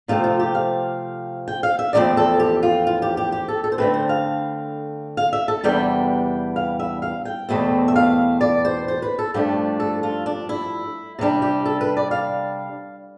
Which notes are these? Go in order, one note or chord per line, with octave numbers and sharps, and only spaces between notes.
C3 F3 A3 C4 F4
F4
G4
F5
G5
F5
E5
E2 D3 F3 A3 C4 D5
A4
G4
F4
F4
G4
G4
G4
A4
A4
C5
D3 A3 C4 B4
C5
F5
F5
E5
A4
E2 C3 G3 B3 D4 G5
F5
E5
F5
G5
E2 B2 A3 C4
E5
F5
D5
C5
C5
B4
A4
G2 F3 A3 D4 G4
A4
F4
D4
E4
C3 G3 D4
G4
A4
B4
D5
F5